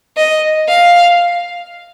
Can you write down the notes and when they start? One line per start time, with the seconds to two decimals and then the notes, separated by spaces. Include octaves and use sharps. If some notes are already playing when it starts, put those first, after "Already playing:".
0.17 D#5
0.69 F5